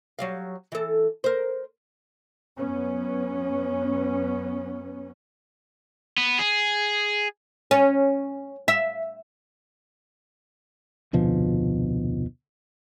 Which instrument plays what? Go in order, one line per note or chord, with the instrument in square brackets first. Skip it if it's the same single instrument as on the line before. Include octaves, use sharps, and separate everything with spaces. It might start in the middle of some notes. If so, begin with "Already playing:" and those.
[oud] F#3 G3 F5
E3 A4
A#4 C5
[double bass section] F#2 B3 C#4
[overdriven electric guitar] B3
G#4
[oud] C#4
E5
[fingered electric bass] F1 D2 B2 F3